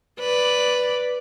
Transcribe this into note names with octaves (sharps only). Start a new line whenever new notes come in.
B4 D5